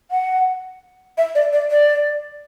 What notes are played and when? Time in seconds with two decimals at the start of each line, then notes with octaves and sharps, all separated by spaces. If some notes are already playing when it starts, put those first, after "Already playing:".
0.11 F#5
1.18 E5
1.35 D5
1.53 D5
1.71 D5